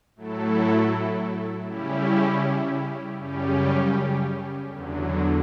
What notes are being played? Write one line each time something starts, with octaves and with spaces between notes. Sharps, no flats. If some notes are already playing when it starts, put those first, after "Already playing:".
A2 F#3 A3 E4 A4
C#3 G3 C#4 E4 G4
F#2 C#3 G3 C#4 G4
E2 D3 F#3